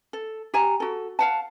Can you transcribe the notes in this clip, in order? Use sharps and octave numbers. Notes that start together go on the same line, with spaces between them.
A4
G4 G#5 A#5
F#4 A4
F5 F#5 A5